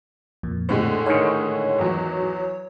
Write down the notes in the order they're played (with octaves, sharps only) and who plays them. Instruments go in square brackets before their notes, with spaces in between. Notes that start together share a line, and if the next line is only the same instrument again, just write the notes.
[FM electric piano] F2 A#2
[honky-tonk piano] A2 D3 G#3 [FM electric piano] C5
[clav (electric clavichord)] G#2 D#3 [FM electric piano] C#5
[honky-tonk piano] E2 F#3